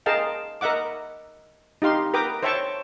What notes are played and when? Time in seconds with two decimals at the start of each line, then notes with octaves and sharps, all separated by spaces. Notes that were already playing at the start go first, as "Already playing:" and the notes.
0.06 G#4 A#4 D#5 F5 G5 A5
0.61 A#4 D#5 E5 F#5 D6
1.82 D#4 G4 F5 C6
2.14 A#4 B4 G5 D6 D#6
2.43 C5 C#5 E5 G5 A5 C#6